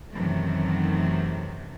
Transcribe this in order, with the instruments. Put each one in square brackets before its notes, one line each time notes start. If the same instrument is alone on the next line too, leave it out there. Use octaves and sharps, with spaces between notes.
[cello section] F#2 C3 D#3 E3 F#3 A3